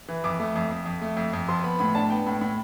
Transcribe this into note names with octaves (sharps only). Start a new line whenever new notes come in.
E3
F2 D6
A3
F2
F2
F2
A3
F2
F2
F3 C6
B3 B5
A2 B5
D4 A5
B3 G5
A2
A2